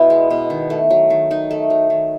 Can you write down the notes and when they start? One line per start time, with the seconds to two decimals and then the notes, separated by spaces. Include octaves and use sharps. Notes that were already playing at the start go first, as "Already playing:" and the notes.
Already playing: B2 B3 E4
0.10 G#3
0.30 B2
0.50 D#3
0.70 A3
0.90 F#3
1.10 D#3
1.31 D#3 D#4
1.51 A3
1.70 F#3
1.90 D#3